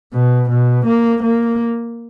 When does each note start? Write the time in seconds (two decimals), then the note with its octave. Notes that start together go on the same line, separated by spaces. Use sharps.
0.14 B2
0.50 B2
0.86 A#3
1.23 A#3